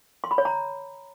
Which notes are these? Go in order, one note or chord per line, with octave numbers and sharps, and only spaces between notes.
C6
B5
C#5
A#5